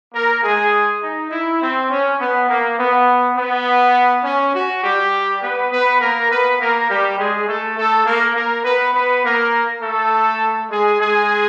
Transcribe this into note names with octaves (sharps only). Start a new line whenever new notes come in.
A#3 A#4
G#3 G#4
D#4
E4
C4
C#4
B3
A#3
B3
B3
C#4
F#4
G3 G4
B3 B4
B3 B4
A#3 A#4
B3 B4
A#3 A#4
G3 G4
G#3 G#4
A3 A4
A3 A4
A#3 A#4
A#3 A#4
B3 B4
B3 B4
A#3 A#4
A3 A4
G#3 G#4
G#3 G#4